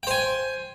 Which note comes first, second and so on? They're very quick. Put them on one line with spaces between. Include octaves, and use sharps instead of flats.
G5 C5 G#5